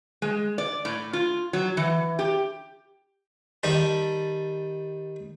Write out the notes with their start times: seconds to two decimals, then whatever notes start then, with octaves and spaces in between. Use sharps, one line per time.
0.22 G#3
0.58 D5
0.85 A2
1.13 F4
1.53 F#3
1.77 E3
2.19 G4
3.63 D#3 G3 A5